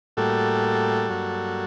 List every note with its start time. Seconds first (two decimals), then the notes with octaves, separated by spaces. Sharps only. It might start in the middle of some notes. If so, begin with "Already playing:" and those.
0.17 A2 G3 A#3 F#4 A4
1.10 G2 F#3 A#3